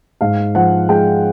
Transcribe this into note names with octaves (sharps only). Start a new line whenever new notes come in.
G#2 F5
F3 F#5
G#3 G5